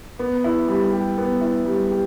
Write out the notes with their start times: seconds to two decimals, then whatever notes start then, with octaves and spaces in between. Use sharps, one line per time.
0.19 B3
0.44 E4
0.68 G3
0.93 G4
1.18 B3
1.41 E4
1.66 G3
1.91 G4